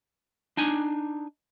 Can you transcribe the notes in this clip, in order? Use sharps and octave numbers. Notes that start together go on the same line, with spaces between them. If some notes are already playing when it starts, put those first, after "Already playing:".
D4 D#4 G#5